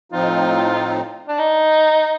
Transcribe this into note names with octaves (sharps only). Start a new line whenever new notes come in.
A2 F3 C4 D#4 F4
D4
D#4